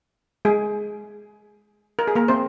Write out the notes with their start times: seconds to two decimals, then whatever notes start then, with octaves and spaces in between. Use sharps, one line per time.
0.45 G#3 G#4
1.99 A#4
2.07 G#4
2.15 A#3 A#4
2.28 C4 C5